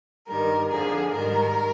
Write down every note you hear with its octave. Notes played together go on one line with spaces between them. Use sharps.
G2 D#3 G3 A#4
F2 D3 F3 G#4
G#2 D#3 G3 A#4